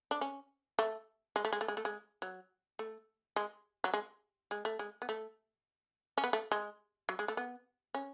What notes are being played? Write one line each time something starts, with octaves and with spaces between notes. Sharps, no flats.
D4
C#4
A3
G#3
A3
G#3
A3
G#3
A3
G#3
F#3
A3
G#3
F#3
G#3
G#3
A3
G#3
B3
A3
C#4
B3
A3
G#3
F#3
G#3
A3
B3
C#4